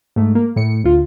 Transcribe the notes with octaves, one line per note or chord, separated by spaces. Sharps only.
G#2 A3
A#3
A2 C#7
D2 F4